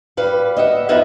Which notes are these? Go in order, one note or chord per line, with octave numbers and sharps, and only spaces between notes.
G3 B4 F5
D#5 E5 F#5
F2 B3 D#4 B4 E5 F5